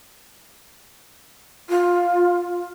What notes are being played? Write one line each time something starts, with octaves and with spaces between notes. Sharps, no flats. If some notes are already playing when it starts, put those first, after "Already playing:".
F4